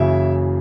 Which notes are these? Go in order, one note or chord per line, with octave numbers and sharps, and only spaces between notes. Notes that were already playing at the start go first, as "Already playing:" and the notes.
Already playing: F#1 F#2 C#3 E3 E4 E5